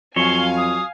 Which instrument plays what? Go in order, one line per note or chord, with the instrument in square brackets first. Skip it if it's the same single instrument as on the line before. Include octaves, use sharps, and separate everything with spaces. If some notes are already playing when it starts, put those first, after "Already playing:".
[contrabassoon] F2 [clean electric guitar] F#3 C#5 [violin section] F5 G#5 [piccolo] G7
[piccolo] D#6